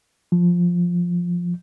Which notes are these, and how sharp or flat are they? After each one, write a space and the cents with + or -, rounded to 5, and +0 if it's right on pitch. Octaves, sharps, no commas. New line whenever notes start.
F3 +5